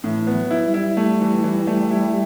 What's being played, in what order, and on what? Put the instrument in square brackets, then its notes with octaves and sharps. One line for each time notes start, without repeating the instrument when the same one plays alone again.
[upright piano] A2 [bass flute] E3
[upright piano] B3
[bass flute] F#3
[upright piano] E4
[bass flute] G3
[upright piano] E4
[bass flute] G3 [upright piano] A3
[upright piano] E3
E3
A3
E4